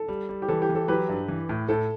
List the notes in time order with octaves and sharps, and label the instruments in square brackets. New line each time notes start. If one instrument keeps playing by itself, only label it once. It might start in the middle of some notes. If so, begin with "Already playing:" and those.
Already playing: [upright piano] A4
[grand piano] G3
G3
[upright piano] G4
[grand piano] E3 [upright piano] A4
[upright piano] G4
[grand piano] E3
[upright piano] A4
[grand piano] F#3 [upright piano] G4 B4
[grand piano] G2
E3
A2
[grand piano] A2 [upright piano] A4